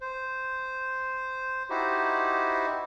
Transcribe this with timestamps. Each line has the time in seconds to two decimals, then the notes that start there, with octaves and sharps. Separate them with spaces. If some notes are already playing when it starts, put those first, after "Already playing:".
0.01 C5
1.70 D#4 E4 F#4 G4 C5